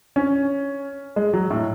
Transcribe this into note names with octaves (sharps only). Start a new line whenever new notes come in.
C#4
G#3
F#3
A2